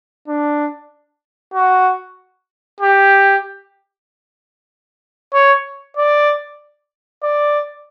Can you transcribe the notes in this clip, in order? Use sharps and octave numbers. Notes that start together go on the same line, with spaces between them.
D4
F#4
G4
C#5
D5
D5